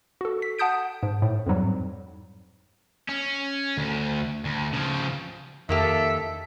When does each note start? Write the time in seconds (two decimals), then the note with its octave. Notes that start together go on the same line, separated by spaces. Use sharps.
0.21 F#4 A4
0.42 B6
0.59 F#5 A5 D#6 G6 D7
1.03 G#2
1.22 A2
1.47 F2 G#2 F#3 G3
3.09 C#4
3.77 D2
4.45 D2
4.73 C#3 F3
5.69 F2 D#3 A#3 G4 A4 E5